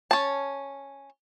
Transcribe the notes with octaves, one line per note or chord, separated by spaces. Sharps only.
C#4 A5